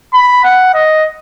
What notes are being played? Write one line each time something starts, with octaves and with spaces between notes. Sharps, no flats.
B5
F#5
D#5